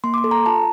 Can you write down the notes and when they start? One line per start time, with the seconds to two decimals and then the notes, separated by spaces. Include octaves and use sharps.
0.04 A#3 C6
0.14 D6
0.18 C6
0.24 A4
0.31 A#5
0.46 F4 A5